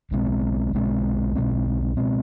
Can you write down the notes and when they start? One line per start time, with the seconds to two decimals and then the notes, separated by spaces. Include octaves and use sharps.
0.11 B1 B2 G#3 C4
0.73 B1 B2 G#3 C4
1.35 B1 B2 G#3 C4
1.97 B2 G#3 C4